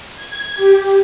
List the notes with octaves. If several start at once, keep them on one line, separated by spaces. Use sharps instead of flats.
G#6
G4